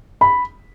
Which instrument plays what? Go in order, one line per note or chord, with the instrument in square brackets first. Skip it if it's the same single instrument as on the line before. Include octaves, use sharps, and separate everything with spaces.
[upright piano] B5